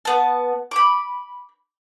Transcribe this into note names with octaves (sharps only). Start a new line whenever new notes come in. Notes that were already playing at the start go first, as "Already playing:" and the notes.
B3 A5
B5 D6